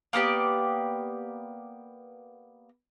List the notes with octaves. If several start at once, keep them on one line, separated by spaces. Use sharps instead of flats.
A#3 B3 G4 D5